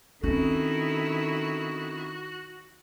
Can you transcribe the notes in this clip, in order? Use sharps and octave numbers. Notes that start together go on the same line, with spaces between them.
D#3 C4 C#4 E4 F#4 A4